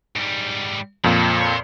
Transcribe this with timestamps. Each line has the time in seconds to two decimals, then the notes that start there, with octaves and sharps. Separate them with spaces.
0.16 G#2 G3
1.04 F2 A#2 G#3 A4
1.41 C#5 C6